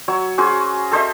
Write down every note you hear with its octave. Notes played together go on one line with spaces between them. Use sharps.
F#3 C#5 E6
C#4 F#4 G#4 C5
A4 C5 D#5 E5